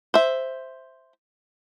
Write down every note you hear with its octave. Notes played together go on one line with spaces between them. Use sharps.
C5 E5